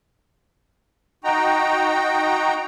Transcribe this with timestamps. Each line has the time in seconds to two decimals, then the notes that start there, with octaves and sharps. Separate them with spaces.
1.24 D#4 F#4 G5 A#5